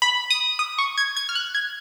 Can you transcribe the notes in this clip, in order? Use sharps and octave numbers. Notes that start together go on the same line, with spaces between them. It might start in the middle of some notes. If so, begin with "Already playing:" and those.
B5
D#6
D#6
C#6
G#6
G#6
F6
F#6
G#6